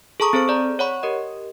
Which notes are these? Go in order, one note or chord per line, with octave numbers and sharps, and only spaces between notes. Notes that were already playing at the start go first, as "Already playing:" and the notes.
G#4 A4 A5 A#5 C#6 D#6
C4 G#4 A4 C5 C#6
G#4 D5 A#5
C#5 F#5 B5 C#6
G4 A#4 D#5